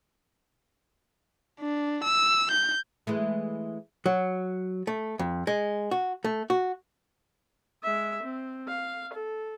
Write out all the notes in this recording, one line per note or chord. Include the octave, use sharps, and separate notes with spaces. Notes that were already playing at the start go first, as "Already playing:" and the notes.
D4
E6
G6
E3 G#3 A3
F#3
A3
F2
G#3
F#4
A3
F#4
G#3 E5
C4
F5
A4